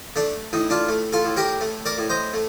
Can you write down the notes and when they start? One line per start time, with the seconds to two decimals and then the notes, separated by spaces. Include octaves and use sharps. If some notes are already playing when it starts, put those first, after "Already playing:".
0.16 A3 D4
0.53 A2 D#4
0.70 D4 F4
0.88 A3
1.13 F4 A4
1.25 A2
1.37 G4 A#4
1.61 A3
1.86 A#4 D5
1.98 A2
2.09 C5 D#5
2.34 A3